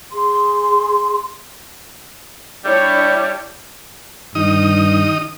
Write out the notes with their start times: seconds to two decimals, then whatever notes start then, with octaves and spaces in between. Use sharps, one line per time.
0.12 G#4 C6
2.65 G3 D4 E4 C#5
4.35 G2 D#3 D#4 D#6